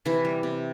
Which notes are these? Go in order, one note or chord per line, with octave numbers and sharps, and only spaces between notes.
C3 E3 E4
G3
C3